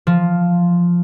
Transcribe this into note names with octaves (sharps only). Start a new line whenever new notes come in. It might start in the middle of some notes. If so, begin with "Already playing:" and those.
F3